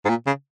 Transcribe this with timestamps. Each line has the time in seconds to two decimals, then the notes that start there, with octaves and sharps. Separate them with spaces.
0.05 G#2
0.09 A#2
0.27 C#3